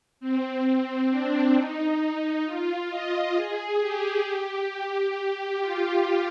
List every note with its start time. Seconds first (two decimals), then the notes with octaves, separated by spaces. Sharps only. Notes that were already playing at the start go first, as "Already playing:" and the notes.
0.20 C4
0.65 C4
1.10 D4
1.55 D#4
2.00 D#4
2.46 F4
2.90 D#5
3.36 G#4
3.80 G4
4.70 G4
5.16 G4
5.61 F4